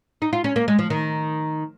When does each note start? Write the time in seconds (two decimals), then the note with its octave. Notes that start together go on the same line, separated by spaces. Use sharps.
0.22 D#4
0.33 F4
0.44 C#4
0.56 A#3
0.68 G#3
0.79 F3
0.90 D#3